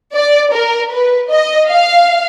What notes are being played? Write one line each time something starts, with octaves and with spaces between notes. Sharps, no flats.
D5
A#4
B4
D#5
F5